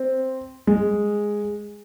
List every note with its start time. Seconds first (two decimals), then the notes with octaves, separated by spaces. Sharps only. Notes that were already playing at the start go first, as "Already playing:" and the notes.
Already playing: C4
0.67 G#3